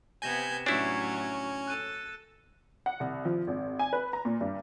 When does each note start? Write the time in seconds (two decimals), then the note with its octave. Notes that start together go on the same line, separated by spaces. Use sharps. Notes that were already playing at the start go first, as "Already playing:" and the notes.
0.22 C3 B3 G#5 G6 G#6 A#6 E7
0.66 A2 F#3 C#4 D4 E4
1.67 A4 F#6 D#7
2.86 F#5
3.00 C2
3.25 F3
3.47 G#1
3.79 G#5
3.93 B4
4.13 A#5
4.25 A#2
4.41 G2